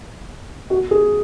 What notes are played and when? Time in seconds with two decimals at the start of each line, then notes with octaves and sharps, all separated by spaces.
0.70 F#4
0.91 G#4